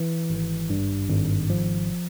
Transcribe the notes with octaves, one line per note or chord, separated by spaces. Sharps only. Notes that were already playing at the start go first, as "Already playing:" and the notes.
Already playing: E3
G#1
G2
G#1
F3